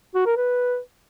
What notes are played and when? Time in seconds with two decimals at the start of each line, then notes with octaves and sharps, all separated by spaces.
0.15 F#4
0.26 A#4
0.37 B4